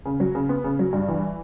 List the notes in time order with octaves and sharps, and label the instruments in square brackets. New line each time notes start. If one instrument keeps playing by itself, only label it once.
[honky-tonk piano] C#3
F#3
C#3
B3
C#3
F#3
G2
E3